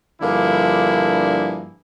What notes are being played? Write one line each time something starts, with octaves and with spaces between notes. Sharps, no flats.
G2 D3 F3 A#3 E4 G#4